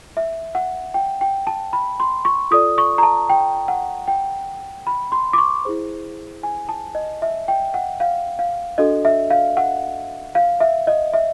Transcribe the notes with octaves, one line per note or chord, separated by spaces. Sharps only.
E5
F#5
G5
G5
A5
B5
C6
C#6
F4 A4 D5 D#6
C#6
A#5
A5
G5
F#5
G5
B5
C6
D6
C#6
E4 G#4 C5
G#5
A5
D#5
E5
G5
F#5
F5
F5
D4 F#4 A4 D#5
E5
F5
F#5
F5
E5
D#5
E5